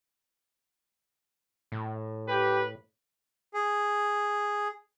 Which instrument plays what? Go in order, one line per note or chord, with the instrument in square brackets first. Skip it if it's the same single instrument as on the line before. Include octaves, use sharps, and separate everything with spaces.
[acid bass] A2
[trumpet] G4 [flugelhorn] B4
[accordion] G#4